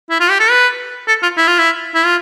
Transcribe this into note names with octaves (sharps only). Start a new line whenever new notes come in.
E4
F4
G4
A4
B4
A4
F4
E4
F4
E4
E4
F4